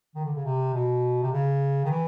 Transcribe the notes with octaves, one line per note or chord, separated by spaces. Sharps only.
D#3
D3
C#3
C3
B2
C3
C#3
D#3
E3